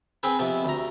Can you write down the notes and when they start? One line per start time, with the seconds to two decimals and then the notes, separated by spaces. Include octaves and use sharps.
0.23 C4 G#4 B4
0.39 F2 C3 B3
0.65 D2 A#5